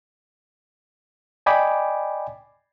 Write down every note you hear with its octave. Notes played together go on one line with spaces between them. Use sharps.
D5 D#5 G5 G#5 B5 D6